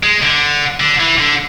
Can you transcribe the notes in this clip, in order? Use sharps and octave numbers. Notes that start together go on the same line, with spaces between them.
G#3
D3
D3
E3
D3